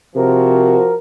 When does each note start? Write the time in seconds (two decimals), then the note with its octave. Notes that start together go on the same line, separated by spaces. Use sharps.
0.16 C3 F3 F#4 A#4